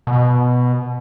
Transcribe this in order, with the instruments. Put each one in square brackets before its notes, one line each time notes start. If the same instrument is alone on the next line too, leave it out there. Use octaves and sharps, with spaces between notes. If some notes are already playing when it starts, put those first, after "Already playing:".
[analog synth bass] B2